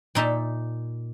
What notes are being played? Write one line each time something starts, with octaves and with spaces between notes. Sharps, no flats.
A#2 D#4 E5 A5